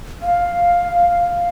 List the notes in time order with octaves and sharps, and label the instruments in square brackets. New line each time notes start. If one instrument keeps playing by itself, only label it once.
[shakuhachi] F5